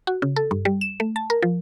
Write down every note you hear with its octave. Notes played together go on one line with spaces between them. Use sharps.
F#4
C#3
A4
G2
G3
E7
A3
A5
A#4
F3